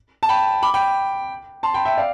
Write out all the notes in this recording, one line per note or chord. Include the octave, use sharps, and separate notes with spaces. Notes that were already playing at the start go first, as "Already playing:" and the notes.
A5
G5 B5
B5 D6
G5 B5
A5 C6
G5 B5
E5 G5
D5 F5